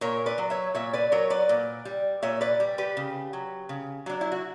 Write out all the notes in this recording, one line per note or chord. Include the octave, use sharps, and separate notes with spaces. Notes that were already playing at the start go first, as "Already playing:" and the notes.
A#2 A#4 C#5
B4 D5
F#3
C#5 E5
A#2 C#5 E5
B4 D5
F#3 A#4 C#5
B4 D5
A#2
G3
A#2 C#5 E5
B4 D5
G3
G4 B4
C#3
F#3
C#3
F#3 D4
E4
F#4